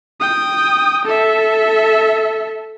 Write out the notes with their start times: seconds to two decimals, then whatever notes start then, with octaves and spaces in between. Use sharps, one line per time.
0.20 G5 D#6
1.05 A4 E5